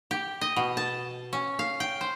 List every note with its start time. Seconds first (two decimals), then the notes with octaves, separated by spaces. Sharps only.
0.11 G4
0.41 D#5
0.56 B2
0.77 A5
1.33 C#4
1.59 F5
1.80 G5
2.01 C5